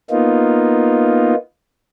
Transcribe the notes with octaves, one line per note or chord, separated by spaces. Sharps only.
A#3 B3 D#4 F4